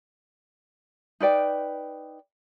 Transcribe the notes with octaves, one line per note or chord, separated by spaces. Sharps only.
D#4 B4 D5 G5